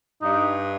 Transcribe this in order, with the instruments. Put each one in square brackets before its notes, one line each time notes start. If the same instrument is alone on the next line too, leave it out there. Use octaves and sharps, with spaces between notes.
[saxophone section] G2 [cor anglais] D#4